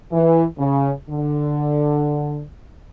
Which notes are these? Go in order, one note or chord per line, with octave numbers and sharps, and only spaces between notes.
E3
C#3
D3